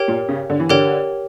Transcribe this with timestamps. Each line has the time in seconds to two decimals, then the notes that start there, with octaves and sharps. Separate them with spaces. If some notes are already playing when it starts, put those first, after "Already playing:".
Already playing: G4 A#4 C#5 G5
0.08 A#2
0.29 C#3
0.50 D3
0.60 E3
0.69 D3 G4 A#4 C#5 G5